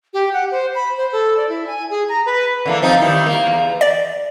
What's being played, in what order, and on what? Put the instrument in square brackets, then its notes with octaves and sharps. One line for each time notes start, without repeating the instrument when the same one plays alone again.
[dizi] G4
F#5
C5
B5
C5
A4
D5
E4
G#5
G#4
A#5
B4
[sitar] D3 E3 A#3
F3 C4 D#4
D#3 G3 E4
A#3
E2
[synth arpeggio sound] D5